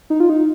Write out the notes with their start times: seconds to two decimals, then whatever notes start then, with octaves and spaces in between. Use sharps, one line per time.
0.10 D#4
0.20 F4
0.30 D#4